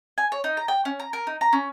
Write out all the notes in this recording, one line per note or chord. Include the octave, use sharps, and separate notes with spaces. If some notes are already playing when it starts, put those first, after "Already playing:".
G#5
C#5
D#4
A#5
G5
C#4
A#5
A#4
D#4
A#5
C#4